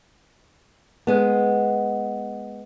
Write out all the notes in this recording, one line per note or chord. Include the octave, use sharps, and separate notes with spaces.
G#3 B3